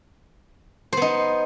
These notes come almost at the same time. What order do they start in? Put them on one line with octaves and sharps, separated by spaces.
C5 B3 D#4